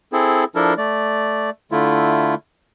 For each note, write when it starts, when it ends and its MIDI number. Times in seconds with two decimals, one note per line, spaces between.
0.13 0.44 60
0.13 0.44 64
0.13 0.44 68
0.13 0.44 69
0.55 0.74 53
0.55 0.74 62
0.55 0.74 64
0.55 0.74 69
0.55 0.74 70
0.77 1.50 57
0.77 1.50 74
1.72 2.35 50
1.72 2.35 57
1.72 2.35 64
1.72 2.35 65